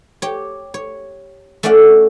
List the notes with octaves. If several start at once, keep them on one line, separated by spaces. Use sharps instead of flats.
G4 C#5
C#5
A3 C#4 D5 F5 F#5